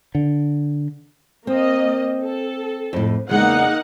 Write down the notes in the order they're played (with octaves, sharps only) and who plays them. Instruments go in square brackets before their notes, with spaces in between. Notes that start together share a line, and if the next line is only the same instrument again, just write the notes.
[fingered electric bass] D3
[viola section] A#3 D#5 [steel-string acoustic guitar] C4
[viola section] A4
[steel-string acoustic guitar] F2 A2
[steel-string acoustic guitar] E2 C#3 G#3 [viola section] A#3 D#4 F#5